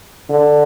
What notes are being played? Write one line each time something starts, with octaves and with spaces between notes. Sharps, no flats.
D3